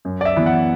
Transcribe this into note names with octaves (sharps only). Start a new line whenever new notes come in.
F#2
D5
E5
E3 B3 E4
F#5